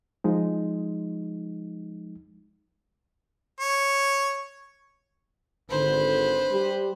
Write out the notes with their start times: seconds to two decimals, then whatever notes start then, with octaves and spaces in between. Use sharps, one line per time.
0.24 F3 G#3 D#4
3.60 C#5
5.70 G#1 D3 B4 C5
6.52 G3 G4